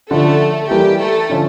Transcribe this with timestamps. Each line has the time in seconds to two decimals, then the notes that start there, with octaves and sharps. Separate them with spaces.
0.11 D3 F3 A3 C#4 A4
0.70 E3 G3 A#3 E4 G4
0.99 A3 A4
1.29 D3 F3 C#4 F4